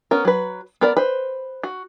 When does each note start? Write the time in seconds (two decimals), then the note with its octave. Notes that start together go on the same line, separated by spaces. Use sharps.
0.11 B3 C#4 A#4
0.25 F#3 B4
0.81 B3 A#4 D5
0.97 B4 C5
1.64 F#4